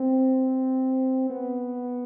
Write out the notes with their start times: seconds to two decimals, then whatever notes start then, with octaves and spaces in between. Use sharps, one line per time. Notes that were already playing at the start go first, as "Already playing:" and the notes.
Already playing: C4
1.30 B3